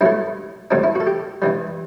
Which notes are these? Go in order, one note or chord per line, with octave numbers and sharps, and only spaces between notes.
G2 F#3 A3 E4
A1 G2 D3 F#3 D4
E4
F#4
A4
G4
G2 E3 G3